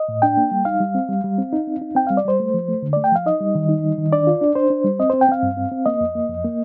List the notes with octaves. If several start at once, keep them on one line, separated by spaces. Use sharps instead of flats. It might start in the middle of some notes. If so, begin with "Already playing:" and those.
Already playing: D#5
A2
D4 G5
A#3
G3
D#4 F5
G3
C4
G3
G3
C4
D#4
C4
D#4
C4 G5
G3 F5
D5
G3 C5
A3
F3
A3
D3
A3 D5
G5
F3 F5
D#4 D#5
G3
D#3
D#4
G3
D#3
D4 D5
F4
D4
D4 C5
D4
G3
C4 D#5
C4 C5
G5
C4 F5
G2
C4
C4
A#3 D#5
F2
A#3
F2
A#3